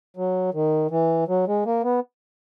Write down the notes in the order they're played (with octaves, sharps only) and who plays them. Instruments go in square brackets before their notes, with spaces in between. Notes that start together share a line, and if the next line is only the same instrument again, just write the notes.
[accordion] F#3
D#3
E3
F#3
G#3
A#3
B3